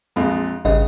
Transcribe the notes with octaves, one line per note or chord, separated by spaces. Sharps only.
A#1 F2 G#3
G#1 G2 C#3 D#5